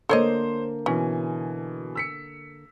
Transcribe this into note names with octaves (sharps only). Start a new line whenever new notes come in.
D3 A#3 A4 C5 C#5 D#5
B2 E3 C#4 G#5
E6 B6 C#7